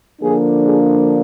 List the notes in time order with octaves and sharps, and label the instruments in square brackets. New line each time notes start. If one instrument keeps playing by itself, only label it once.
[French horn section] D3 F3 A#3 D4 G#4
G#4